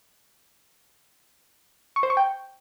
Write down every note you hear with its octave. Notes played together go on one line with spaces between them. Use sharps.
C#6
C5
C#6
G5